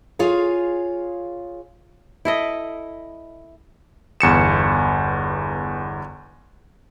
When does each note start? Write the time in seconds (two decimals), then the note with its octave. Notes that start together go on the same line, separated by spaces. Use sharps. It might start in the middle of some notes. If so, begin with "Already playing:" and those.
0.19 F4 G#4 C#5 F5
2.25 E4 A4 D#5
4.21 G1 E2 C#7 E7